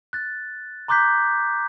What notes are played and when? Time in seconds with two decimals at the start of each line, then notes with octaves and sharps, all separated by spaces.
0.13 F#6 A6
0.88 A#5 C6 D6 F#6 G6 B6